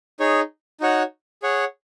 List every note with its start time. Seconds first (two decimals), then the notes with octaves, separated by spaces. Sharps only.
0.20 D#4 G#4 C#5
0.80 D#4 F#4 C#5 F#5
1.42 G#4 C#5 F#5